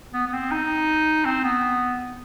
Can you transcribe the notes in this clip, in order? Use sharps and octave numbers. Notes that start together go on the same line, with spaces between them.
B3
B3
C4
D#4
C4
B3